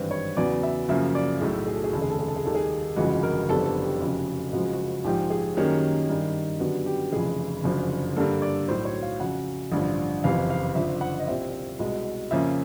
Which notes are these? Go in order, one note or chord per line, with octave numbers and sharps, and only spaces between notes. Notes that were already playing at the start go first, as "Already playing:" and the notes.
Already playing: G#1 G2 E3 G3 C4 B4
C#5
E2 C#3 F#3 B3 D5
E5
F#2 C#3 F3 A#3 E5
D5
B1 A2 F#3 A3 G#4
G#4
A4
G#4
F1 D#2 C#3 A4
G#4
A4
G#4
A4
G#4
D#2 D#3 G3 A4
G#4
G1 F2 C#3 E3 G#3 F#4
A#4
F#1 F2 D3 G3 B3 A4
A4
G4
F1 F2 C#3 F#3
F#1 F#2 C#3 F3 G#3 F#4
F#4
A#1 G#2 F3 G4
G#4
F#2 D#3 G3 A#3 C#4
G2 D#3 G3
F#2 D3 G3 B3 F#4
G4
F1 F2 C#3 E3 G#4
F#1 F#2 D3 F3
G2 D3 G3 A#3 A4
D5
B1 A2 F#3 C5
C#5
F5
F2 C#3 F#3 F#5
A1 G2 D3 F3
F#1 F2 C3 E3 F5
F5
F#1 F2 D3 F3 E5
F#5
D#5
C2 A#2 G3 C4 E5
C2 B2 G#3
F2 C#3 F3 A#3 C#4 E5